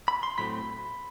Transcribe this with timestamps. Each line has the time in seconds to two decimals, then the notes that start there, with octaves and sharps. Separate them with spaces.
0.08 B5
0.23 C6
0.38 A2 F#3 A3 C4 B5